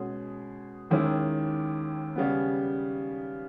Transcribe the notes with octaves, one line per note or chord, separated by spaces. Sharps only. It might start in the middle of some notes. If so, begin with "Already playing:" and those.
Already playing: B2 G#3 C#4 G#4
D#2 D#3 G#3 C#4 E4
C#3 G3 B3